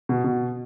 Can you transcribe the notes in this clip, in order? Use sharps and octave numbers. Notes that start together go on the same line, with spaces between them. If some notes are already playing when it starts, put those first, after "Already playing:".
B2
B2